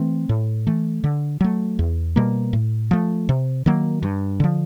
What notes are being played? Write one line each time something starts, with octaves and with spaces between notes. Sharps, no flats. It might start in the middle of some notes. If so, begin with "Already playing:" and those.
Already playing: E3 A3 C4
A2
E3 A3
D3
F#3 A3
E2
B2 G3 A#3
A2
F3 A3
C3
D#3 F#3 A#3
G2
D3 F3